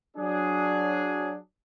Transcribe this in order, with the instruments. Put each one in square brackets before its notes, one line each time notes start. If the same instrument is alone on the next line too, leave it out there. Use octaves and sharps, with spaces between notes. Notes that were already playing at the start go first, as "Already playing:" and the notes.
[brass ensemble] F#3 D4 G#4